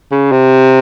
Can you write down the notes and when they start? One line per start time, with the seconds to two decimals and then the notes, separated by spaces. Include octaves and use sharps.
0.11 C#3
0.32 C3